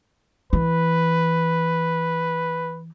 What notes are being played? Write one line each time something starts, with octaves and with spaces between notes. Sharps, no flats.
E3 B4